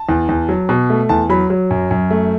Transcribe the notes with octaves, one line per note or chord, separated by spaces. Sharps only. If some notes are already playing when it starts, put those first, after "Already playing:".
Already playing: A5
E2
E2
F#3
B2
A3
E2 A5
F#3 B5
F#3
F#2
F#2
A3